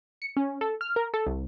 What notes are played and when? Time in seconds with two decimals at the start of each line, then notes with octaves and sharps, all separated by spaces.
0.22 C#7
0.37 C#4
0.61 A4
0.81 F6
0.96 A#4
1.14 A4
1.26 C2